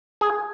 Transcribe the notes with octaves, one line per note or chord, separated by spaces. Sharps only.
G#4